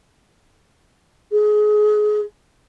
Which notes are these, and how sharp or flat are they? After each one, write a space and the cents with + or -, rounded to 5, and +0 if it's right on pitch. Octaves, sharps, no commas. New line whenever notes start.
G#4 +25